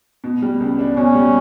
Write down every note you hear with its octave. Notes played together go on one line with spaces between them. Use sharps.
B2
G3
C#2
D4
B2 C#4
G3